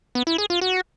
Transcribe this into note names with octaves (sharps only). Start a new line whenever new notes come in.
B3
E4
G#4
F4
F#4